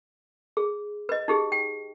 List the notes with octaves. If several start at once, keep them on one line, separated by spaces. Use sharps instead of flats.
G#4
B4 D#5
D#4 G4 G#4
G5